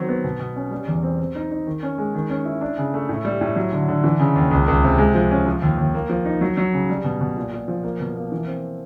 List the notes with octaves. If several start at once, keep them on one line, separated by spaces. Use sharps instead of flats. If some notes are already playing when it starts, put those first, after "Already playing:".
Already playing: D#3 F#3 C4
B3
B2
B2
C#4
G3
E2
C4
C4
D#4
D#4
D#3
C#4
G#3
D#3
C#4
E4
D4
C#3
A3
A2
G3
A2
F#3
D3
D3
E3
C#3
D#2
C#2
C#2
C3
G#3
F3
C#4
F3
D#2
D#2
A#3
F3
D#4
F#3
F#3
C#3
G3
B2
B2
A#2
A#2
F3
A#3
B2
A#3
E3
C4